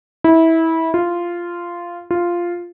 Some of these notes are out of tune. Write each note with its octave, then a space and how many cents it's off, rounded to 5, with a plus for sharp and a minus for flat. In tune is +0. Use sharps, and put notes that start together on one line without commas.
E4 -20
F4 -10
F4 -5